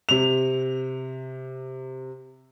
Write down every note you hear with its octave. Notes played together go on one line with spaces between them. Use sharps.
C3 F7